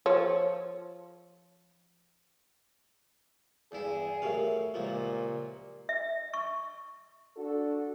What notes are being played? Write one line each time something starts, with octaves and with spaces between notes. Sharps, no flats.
F3 C#5
E2 G2 E4 G#4
A2 F#3 G4 A#4 E5 F5
C#2 A#2 F3 F#3
E5
C#6
D4 F#4 A4